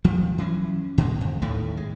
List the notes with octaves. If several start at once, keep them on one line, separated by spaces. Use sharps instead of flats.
E1 F3 G3
E3 F#3 A#3 C#4
A#2 D3 G#3 A#3
F2
D#2 A2 D#3 A3
G#3